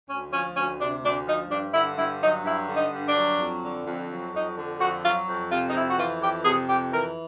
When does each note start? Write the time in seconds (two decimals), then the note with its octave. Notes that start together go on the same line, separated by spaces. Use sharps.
0.09 D2 C#4
0.33 F3 C#4
0.56 D2 C#4
0.80 C3 D4
1.03 D2 D4
1.26 F3 D#4
1.50 G2 D4
1.73 D3 E4
1.97 G2 E4
2.21 F#3 D#4
2.44 G2 E4
2.68 D3
2.75 D#4
2.91 G2
3.08 D4
3.15 F#3
3.39 F2
3.62 D3
3.86 F2
4.09 F#3
4.33 F2 D#4
4.56 D3
4.79 F2 F#4
5.03 F#3 F4
5.27 F2
5.50 C3 F4
5.68 D#4
5.74 F2 E4
5.89 F#4
5.97 E3 F4
6.21 F2 G4
6.44 C3 G#4
6.68 F2 G4
6.91 E3 A#4